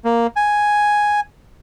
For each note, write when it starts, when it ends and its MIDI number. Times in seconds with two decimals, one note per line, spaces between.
0.05 0.27 58
0.36 1.20 80